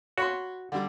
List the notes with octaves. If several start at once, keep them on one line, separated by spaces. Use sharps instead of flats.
F#4 C#5 B5 C6
D3 G3 D6